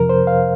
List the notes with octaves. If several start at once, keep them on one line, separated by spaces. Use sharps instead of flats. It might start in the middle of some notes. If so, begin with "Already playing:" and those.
Already playing: F2 C3 F3 A#4
C5
F5